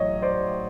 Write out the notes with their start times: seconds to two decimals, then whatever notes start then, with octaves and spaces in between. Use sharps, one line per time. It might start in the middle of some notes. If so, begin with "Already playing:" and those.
Already playing: A1 A2 F#3 C#5 D#5
0.22 C5 D5